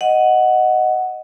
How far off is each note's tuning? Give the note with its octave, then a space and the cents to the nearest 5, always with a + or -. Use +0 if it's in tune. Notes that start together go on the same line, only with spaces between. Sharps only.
D#5 +0 F#5 +0